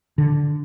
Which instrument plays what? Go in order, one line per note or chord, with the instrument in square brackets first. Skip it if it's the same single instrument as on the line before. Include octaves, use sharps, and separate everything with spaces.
[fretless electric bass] D3